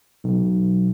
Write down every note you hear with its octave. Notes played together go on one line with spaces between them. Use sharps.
B1